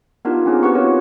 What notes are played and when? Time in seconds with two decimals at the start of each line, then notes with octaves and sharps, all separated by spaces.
0.25 B3 D4 D#4 F4 G4 A#4
0.46 C4 C#4 D#4 G#4
0.63 F#4 G4 B4 F#5 C#6
0.75 C4 D#4 F4 F#4 A#4 C#5